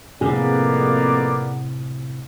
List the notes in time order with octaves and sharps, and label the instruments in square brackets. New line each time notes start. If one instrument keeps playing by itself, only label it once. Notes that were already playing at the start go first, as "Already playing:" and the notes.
[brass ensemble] F2 A#3 B3 [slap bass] A2 C3 [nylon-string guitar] G#4 [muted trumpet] D5